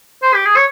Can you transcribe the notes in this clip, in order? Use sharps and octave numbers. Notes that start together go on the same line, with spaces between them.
C5
G4
G#4
C#5